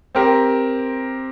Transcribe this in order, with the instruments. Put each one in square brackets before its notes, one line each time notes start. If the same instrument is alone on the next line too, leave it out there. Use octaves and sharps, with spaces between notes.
[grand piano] C4 G4 A#4